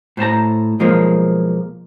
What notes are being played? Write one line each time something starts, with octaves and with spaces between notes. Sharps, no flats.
A2 C5 A5 A#5
B1 F3 G#3 A#3